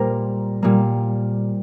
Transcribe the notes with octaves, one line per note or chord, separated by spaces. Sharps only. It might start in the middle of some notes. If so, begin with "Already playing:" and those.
Already playing: A#2 G3 A#3 A#4 C5
A#2 G3 A#3